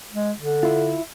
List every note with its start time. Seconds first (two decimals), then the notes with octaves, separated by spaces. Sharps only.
0.14 G#3
0.40 D3
0.63 E4 F4